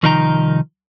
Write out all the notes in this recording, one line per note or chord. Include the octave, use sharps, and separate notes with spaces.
C2 D#3 F3 D#4 G5 A#5